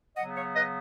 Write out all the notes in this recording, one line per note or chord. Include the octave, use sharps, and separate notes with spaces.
C#3 F#3 B3 D#5 F#5
C#5 F5
B4 D#5